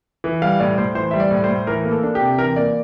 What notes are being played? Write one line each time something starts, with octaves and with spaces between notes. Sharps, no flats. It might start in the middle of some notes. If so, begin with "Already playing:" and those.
E3
G3 F5
A2 D5
A2 C5
E3 C5
G3 E5
D5
A2
C5
A2
E3 A#4
A#3
A4
D4
G4
C3
E3 A#4
A#3 D5